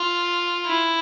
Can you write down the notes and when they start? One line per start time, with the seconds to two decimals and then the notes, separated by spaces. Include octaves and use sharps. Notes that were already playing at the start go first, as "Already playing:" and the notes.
Already playing: F4
0.66 E4